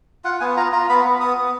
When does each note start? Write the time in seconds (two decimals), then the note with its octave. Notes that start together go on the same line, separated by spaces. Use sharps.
0.24 F4 F#5
0.40 B3 G#5
0.56 F4 A#5
0.72 F4 A#5
0.89 B3 B5
1.05 B3
1.21 B3 D#6
1.38 B3